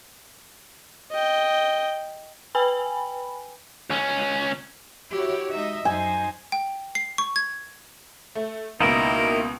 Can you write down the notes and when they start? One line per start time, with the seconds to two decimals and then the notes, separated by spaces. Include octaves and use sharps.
1.11 D#5 G5
2.55 B4 G5 G#5 B5
3.90 C#2 C#4
5.11 E4 F#4 G4 C#5
5.51 G#3 D#4 D#5 E5
5.85 F#2 D#4 C5 G#5
6.52 G5
6.95 C7
7.18 C#6
7.36 G#6
8.35 A3
8.81 C#2 B2 A#3 D#4 E4 A#4